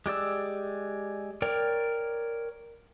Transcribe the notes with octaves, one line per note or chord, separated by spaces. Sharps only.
G#3 G4 D5 E6
A#4 C#5 D5 G5